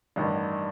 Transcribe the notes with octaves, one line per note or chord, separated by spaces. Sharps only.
A1 G2 D#3 G3